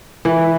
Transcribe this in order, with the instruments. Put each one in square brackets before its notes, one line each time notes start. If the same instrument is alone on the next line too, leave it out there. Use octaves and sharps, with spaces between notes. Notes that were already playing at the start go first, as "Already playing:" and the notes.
[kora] E3